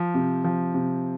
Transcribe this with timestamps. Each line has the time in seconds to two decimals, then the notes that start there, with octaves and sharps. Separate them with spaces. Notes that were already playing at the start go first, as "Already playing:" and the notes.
Already playing: F3
0.14 C3
0.45 F3
0.74 C3